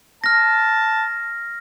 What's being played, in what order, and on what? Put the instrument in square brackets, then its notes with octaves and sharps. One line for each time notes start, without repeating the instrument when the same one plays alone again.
[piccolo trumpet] A5 [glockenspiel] F6 A#6